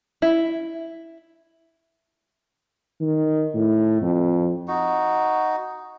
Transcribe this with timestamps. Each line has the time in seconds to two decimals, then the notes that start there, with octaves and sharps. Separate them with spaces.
0.22 E4
3.00 D#3
3.54 A2
4.01 F2
4.68 D#4 F#4